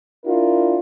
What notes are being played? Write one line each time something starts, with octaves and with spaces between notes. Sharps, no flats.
D4 E4 F4 A#4